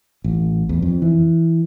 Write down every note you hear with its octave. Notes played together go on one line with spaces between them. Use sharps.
A1
E2
F2
E3